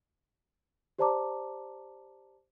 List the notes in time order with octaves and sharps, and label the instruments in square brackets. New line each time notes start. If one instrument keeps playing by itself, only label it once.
[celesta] G4 C5 D5 A5 A#5 D6